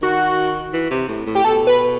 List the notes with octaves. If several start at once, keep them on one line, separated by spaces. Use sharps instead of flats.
D#3 F#4
E3
C3
A2
A2
G4
B2 A4
B4